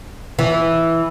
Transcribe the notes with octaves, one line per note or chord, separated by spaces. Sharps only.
E3